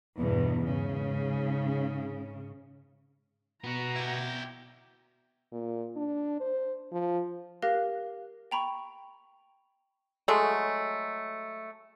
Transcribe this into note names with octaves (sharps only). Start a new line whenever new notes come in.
E2 G2 B2
G#2 C#3
B2 B3 F#4 A#5
E4 G4
A#2
D4
C5
F3
G4 A#4 F5 F#6 A#6
G5 A#5 B5 C#6
F#3 G#3 A3